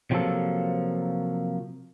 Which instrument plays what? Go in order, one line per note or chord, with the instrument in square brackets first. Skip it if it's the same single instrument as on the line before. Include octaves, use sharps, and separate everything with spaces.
[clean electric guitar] C3 F3 F#3 A#3 A4